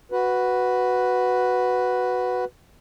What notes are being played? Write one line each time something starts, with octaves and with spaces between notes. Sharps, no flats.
F#4 B4